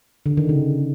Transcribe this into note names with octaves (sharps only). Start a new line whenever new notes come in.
D3
D#3
C#3